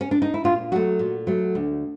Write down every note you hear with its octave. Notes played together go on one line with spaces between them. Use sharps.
C#4
D4
D#4
E4
A#2 F4
F#3 A3 F#4
A#2
F#3 A3
D2